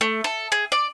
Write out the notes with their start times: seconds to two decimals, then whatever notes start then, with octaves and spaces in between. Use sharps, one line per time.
0.01 A3
0.24 A4
0.52 G#4
0.72 D5